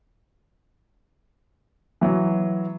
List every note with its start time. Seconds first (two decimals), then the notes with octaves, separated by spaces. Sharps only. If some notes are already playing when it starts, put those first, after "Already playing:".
2.01 E3 F#3